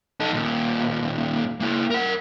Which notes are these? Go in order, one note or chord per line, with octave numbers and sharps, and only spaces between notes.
D#4 A4
D#2 A#2
A#3 E4
A#4 F#5